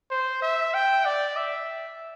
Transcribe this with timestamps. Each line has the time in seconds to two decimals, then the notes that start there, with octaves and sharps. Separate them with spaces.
0.11 C5
0.42 E5
0.74 G5
1.05 D5
1.37 E5